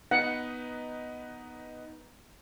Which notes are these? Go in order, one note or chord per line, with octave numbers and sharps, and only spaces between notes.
B3 D#4 B4 F#5